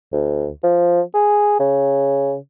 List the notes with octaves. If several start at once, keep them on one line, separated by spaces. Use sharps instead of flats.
D2
F3
G#4
C#3